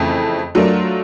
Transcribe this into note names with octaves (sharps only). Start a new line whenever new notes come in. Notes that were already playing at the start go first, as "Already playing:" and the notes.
Already playing: F2 C#3 E3 A3
F#3 A3 D4 F4 A#4